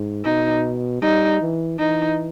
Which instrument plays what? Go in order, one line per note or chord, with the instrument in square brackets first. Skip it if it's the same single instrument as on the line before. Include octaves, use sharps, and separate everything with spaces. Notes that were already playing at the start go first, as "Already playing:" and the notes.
Already playing: [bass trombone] G#2
[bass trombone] B2 [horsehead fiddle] D#4
[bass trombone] G3 [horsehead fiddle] D#4
[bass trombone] E3
[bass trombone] E3 [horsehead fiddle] D#4